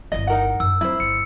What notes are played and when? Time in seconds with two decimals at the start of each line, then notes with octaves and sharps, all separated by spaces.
0.12 G1 E4 D#5
0.27 D#4 A#4 F#5
0.60 F#2 E6
0.81 F#3 C4 E4 C5
1.00 G1 C#7